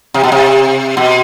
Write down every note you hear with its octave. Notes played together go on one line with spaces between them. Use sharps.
C3
B2
C3
B2